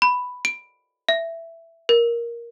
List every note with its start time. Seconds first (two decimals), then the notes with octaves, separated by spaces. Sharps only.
0.02 B5
0.45 D7
1.09 E5
1.89 A#4